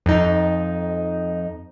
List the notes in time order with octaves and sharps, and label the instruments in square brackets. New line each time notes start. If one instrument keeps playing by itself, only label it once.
[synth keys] F2 D#4